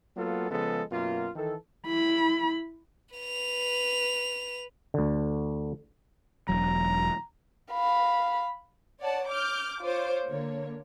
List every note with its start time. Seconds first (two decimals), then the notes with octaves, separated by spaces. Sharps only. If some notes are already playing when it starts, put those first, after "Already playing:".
0.17 F#3 A#3 B3 F4 A4
0.51 C#3 F3 G#3 B3 A4
0.91 F#2 B2 A#3 F4
1.36 D#3 E3 A4
1.87 E4 B5
3.15 B4 F7
4.94 D2 D3
6.49 E1 F#3 A#5
7.72 F5 B5
9.00 C#5 D5 F#5 A5
9.29 D6 F6 G6
9.82 F4 C5 C#5 D6
10.27 D3 A#3 C#5